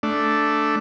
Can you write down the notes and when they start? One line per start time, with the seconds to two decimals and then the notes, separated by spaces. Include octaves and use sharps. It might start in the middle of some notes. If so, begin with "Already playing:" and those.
0.03 A3 D4